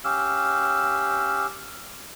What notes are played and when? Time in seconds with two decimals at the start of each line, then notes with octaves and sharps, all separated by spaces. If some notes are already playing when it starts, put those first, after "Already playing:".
0.05 C#4 G4 F5 E6